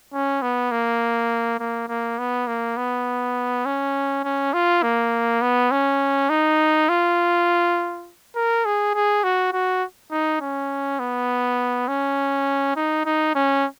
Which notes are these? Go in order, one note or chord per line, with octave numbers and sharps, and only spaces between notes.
C#4
B3
A#3
A#3
A#3
B3
A#3
B3
C#4
C#4
F4
A#3
B3
C#4
D#4
F4
A#4
G#4
G#4
F#4
F#4
D#4
C#4
B3
C#4
D#4
D#4
C#4